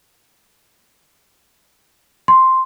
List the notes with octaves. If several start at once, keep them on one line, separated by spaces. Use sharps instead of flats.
C6